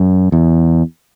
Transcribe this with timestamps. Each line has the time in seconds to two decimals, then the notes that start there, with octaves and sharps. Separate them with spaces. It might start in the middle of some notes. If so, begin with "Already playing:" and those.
Already playing: F#2
0.32 E2